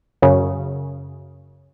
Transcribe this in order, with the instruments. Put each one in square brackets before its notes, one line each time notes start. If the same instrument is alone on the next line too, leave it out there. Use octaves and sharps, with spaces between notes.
[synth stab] F#2 C#3